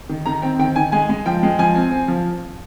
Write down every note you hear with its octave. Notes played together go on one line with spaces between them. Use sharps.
D#3
D#3 A#5
C4 G5
D#3 G5
D#3 G#5
G#3 G#5
G#3
F3 G5
G#3
F3 G#5
C4
C4
F3